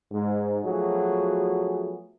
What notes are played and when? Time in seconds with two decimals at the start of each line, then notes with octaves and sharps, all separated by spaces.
0.12 G#2
0.65 F3 F#3 A3 B3 F#4 G#4